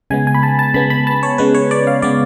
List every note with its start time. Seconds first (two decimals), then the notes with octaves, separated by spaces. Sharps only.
0.10 C#3 G#3 B3 G#5
0.27 G#5
0.34 B5
0.43 A5
0.59 A5
0.74 C#3 G#3 B3 B5
0.90 B5
1.07 A5
1.23 C#5
1.38 C#3 G#3 B3 B4
1.55 C#5
1.71 D5
1.87 F5
2.02 C#3 G#3 B3 D5